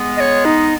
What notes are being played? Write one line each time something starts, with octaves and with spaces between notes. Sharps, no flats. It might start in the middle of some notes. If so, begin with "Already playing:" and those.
Already playing: G#3 B3
D#5
C#5
D#4